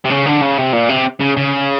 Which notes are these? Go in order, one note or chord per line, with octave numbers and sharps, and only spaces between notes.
C3
C#3
D3
C#3
C3
A#2
C3
C#3
C#3